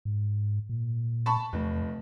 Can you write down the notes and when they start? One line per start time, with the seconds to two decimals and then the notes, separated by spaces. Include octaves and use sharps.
0.05 G#2
0.69 A#2
1.26 A5 B5 C#6
1.53 F1 E2